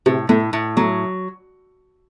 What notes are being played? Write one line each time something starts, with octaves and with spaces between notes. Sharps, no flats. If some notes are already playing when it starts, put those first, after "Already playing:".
A2 C3
A2 A3
A2
F#3 A3